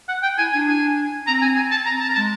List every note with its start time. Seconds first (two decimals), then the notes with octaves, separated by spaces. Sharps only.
0.08 F#5
0.23 G5
0.38 E4 G#5
0.53 D4 G#5
0.67 G#5
1.27 C4 A#5
1.42 G#5
1.56 G#5
1.71 A5
1.86 A#5
2.00 A5
2.09 A#5
2.15 G#3 A5